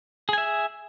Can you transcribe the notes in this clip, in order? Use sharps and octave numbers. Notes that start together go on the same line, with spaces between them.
G#4 E5 G#5